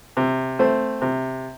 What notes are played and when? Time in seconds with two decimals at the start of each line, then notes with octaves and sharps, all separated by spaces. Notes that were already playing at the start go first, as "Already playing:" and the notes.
0.17 C3
0.59 A3 C4
1.02 C3